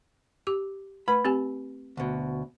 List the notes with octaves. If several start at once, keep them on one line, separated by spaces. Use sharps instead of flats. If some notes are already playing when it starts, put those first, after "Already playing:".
G4 D6
A3 B4 B5
C4 G4 G#5
D2 B2